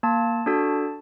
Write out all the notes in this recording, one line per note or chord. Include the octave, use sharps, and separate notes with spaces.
A#3 A5
D4 F#4 A4 A5